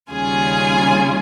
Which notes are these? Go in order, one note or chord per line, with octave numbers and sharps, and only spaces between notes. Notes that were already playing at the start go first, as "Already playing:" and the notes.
D#2 C#3 G3 C#4 F4 G#4 G#5